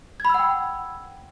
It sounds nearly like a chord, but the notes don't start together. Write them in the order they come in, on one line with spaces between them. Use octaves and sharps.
G#6 B5 E6 F#5 G5